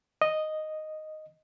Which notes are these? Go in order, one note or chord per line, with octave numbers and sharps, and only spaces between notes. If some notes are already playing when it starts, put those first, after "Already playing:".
D#5